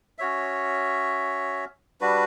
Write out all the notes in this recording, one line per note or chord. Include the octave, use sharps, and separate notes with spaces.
C#4 F#4 C#5 E5
G3 D4 F#4 B4